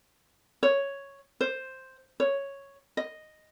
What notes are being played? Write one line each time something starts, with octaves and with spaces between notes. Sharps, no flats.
C#5
C5
C#5
D#5